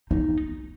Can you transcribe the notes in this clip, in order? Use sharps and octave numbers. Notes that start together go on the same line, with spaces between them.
D#4